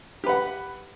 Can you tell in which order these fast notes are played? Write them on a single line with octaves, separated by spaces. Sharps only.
G4 B4 F#5